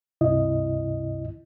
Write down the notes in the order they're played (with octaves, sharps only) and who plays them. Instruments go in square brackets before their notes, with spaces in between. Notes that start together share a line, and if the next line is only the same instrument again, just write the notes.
[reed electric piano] C#2 G2 C3 E4 D#5